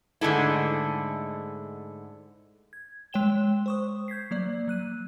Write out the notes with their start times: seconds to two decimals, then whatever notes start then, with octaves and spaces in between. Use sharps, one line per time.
0.21 G#2 D3 G#3 A3 E4
2.73 G#6
3.13 G#3 C#5 G5 E7 G7
3.66 C5 C#6 D#6
4.08 G6 G#6 B6 C7
4.31 F#3 A#3 D5
4.68 F#3 F#6 D#7